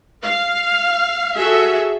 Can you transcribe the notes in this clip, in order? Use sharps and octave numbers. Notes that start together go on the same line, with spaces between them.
F5
F#4 G#4 A4 E5